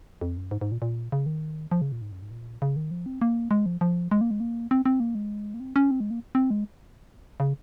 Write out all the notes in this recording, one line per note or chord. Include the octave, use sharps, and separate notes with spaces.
F2
F#2
G#2
G#2
A#2
A#2
C#3
D#3
F3
C#3
A#2
G#2
F#2
G#2
A#2
C#3
D#3
F3
C4
A#3
G#3
F3
F3
G#3
A#3
G#3
A#3
C4
C4
A#3
G#3
A#3
C4
C#4
C4
G#3
A#3
C4
G#3
C#3